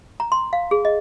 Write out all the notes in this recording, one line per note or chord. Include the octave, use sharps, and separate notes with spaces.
A#5
C6
F5
G#4
D#5